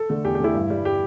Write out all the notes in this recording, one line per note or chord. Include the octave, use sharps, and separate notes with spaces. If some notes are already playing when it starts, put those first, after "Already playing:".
Already playing: A4
D3 A3
E2 G4
G4
D3 A3 E4
G2
G3
G4